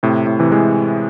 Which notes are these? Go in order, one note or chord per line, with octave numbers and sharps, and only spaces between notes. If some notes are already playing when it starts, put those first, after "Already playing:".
A2 C3
A2
C3 E3
E3 G#3